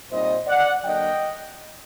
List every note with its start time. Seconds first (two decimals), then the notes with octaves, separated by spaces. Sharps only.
0.10 A#2 G3 C4 D#4 C5 D#5
0.47 D5 F#5
0.84 D3 F#3 A#3 D4 D#5 G5